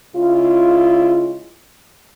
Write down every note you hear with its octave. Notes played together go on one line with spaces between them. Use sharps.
C#3 G#3 E4 F4